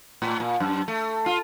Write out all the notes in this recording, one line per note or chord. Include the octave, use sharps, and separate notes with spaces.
A2
A#2
F#2
A3
F4